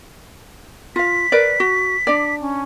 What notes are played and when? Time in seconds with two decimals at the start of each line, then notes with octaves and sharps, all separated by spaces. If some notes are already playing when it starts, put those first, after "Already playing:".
0.96 F4 F5 B6
1.32 A#4 B4 D5
1.60 F#4
2.07 D4 D5
2.41 C#4